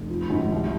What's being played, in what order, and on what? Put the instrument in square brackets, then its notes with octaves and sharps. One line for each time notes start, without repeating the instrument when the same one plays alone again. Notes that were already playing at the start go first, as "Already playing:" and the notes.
Already playing: [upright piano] F1
F3
G#1
C2